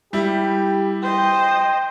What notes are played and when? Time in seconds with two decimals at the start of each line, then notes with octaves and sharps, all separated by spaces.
0.13 G3 E4 G4
1.03 C5 D#5 G5